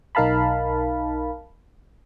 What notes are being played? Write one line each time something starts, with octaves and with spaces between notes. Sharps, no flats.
B1 D#4 A#4 F5 A5 B5